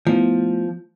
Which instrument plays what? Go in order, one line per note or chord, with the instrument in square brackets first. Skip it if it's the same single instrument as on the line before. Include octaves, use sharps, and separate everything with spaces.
[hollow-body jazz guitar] F3 [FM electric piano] A3 B3 E4